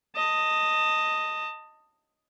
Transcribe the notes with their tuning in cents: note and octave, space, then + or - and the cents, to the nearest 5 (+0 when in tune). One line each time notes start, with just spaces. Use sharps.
D#5 +0 A5 +25